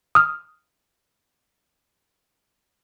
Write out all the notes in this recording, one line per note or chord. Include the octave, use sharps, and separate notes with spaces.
D#6 F6